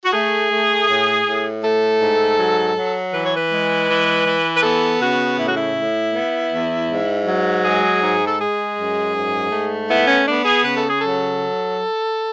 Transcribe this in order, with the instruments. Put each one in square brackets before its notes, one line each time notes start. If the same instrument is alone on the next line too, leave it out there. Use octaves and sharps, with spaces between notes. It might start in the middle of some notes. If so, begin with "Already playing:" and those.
[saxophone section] F#4
A3 G#4
A3
A2
A2
A3 A4
G#2
F#3
F#3
E3 B4
C#5
B4
G#3
E3
E3
B4
B3 A4
C#3 F#4
A2 E4
F#4
E4
A2
B3
E2
G#2
F#3
G#3 G#4
G#2
A4
G#3 G#4
F#2
G#2
A3
B3 E4
C#4
B3 D4
G#4
C#3 B4
A4
G#4
F#3 A4